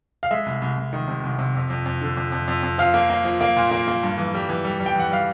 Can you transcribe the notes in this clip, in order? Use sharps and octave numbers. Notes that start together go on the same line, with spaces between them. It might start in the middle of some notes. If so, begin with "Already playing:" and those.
F5
G#3 E5
C2
C2
C2
D#3
C3
C2
C3
F2
F2
F2
D3
F2
F2
F2
F2
F3 F5
A#3
A#3
F3
A#3
A#2
A#3
A#3
G2
E3
G3
E3
G3
G3
G5
E3 F#5
G3 F5